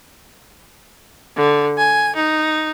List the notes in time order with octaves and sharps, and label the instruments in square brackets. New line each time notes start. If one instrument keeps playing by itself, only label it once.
[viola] D3
G#5
D#4